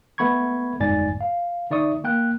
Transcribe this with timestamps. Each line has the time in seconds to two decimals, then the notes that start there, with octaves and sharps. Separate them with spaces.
0.18 A3 B3 B5 C#6 G#6
0.80 G1 F2 G#2 D5 G#5 A6
1.21 F5
1.71 D3 D#4 D5 E5 C#6 D#6
2.04 A#3 G5 F#6